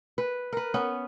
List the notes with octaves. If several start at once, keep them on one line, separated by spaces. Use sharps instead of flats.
B4
A#4 B4
B3 C#4